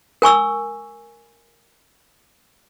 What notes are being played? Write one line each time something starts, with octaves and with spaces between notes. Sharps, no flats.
A#4 G#5 C#6 E6